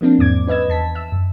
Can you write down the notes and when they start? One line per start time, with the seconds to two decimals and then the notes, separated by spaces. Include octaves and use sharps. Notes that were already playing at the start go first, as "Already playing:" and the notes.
0.01 F3 A#3 C4 D4
0.19 E2 G#2 D6 G#6
0.47 C#4 B4 D#5 E6 G#6
0.69 E2 A5 B6
0.95 E5 E6
1.12 F#2